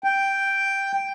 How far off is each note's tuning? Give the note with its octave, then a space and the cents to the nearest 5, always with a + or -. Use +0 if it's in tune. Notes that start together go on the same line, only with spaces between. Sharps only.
G5 +0